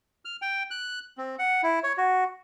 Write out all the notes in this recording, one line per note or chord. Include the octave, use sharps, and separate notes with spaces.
F6
G5
F#6
C4
F#5
E4
C#5
F#4